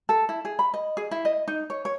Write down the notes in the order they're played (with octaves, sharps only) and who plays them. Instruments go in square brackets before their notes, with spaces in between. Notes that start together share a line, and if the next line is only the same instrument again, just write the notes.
[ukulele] A4
E4
G#4
B5
D#5
G#4
E4
D#5
D#4
C#5
C#5